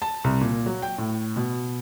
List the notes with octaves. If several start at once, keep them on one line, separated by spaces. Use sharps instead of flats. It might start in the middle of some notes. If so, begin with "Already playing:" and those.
A5
C2
A#2
F#3
G5
A2
B2